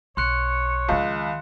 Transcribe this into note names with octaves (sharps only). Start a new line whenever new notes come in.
B1 C#5 C6 F#6 C#7
C#2 D#3 F3